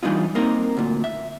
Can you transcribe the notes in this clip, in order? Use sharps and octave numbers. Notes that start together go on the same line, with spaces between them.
E3 G3 D4 D#4 F4
A#3 C4 D#4 A#4
D2 A#2
E5